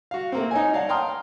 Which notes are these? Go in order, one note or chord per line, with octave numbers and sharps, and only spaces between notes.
F#4 F5
A3 A#3 C4
D#4 C#5 G#5
C#5 D5 F5 F#5 A5
F5 G5 A#5 C6 D#6 F6